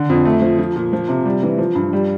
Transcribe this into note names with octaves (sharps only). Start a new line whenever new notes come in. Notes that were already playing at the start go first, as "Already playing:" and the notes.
Already playing: D3
F2
A3
F3
F3
A#2
F3
C3
G3
E3
F3
G2
G3